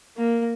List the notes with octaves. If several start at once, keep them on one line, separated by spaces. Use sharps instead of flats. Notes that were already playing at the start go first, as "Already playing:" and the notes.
A#3